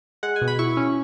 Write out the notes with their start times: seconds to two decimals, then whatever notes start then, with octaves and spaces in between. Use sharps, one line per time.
0.23 G#3 F#5
0.36 G#5
0.41 B2
0.48 B5
0.59 E4 C#6
0.77 C#4